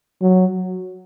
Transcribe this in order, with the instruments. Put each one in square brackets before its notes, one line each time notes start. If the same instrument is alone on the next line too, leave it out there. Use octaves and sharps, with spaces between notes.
[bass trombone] F#3